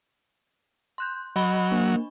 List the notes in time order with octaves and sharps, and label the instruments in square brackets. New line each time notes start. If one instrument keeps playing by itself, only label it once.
[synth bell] C6 F#6 G6
[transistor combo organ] F#3 [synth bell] D#5 B5 G7
[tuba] A#3 [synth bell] D4